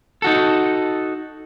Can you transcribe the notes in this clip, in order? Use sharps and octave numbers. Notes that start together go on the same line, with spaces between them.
D#4 F#4 A4